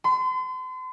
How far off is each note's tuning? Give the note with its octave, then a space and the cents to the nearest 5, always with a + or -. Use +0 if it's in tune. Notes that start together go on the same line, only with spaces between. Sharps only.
C6 -40